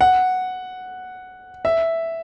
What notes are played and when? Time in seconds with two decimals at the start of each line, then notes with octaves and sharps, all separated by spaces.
0.01 F#5
1.65 E5